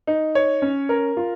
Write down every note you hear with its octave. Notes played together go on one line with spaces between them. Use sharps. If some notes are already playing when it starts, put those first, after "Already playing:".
D#4
C#5
C#4
A#4
F4